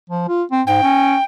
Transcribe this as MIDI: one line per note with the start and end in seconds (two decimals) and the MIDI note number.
0.10 0.25 53
0.28 0.43 65
0.51 0.62 60
0.67 0.82 44
0.67 1.24 79
0.83 1.16 61